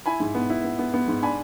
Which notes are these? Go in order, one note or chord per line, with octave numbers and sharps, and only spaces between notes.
E4 G#5 B5
G#2
B3
E4
B3
B3
B3
G#2
D4 G#5 B5